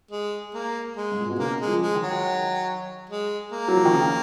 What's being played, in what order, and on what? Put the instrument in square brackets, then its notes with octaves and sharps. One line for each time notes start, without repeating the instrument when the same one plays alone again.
[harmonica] G#3
A#3
G#3
[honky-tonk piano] G#2
A#2
B2
[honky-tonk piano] C#3 [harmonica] A#3
[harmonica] G#3
[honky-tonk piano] F3
[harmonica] G#3
[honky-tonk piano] D#3
[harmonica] F#3
G#3
A#3
[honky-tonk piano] F#3
F3
D#3
C#3